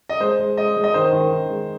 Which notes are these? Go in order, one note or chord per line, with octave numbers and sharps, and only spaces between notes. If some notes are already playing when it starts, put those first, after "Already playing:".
D#5
G#3 C5
G#3
G#3 D#5
G#3
D#5
D#3 C5
D#3
D#3
G#3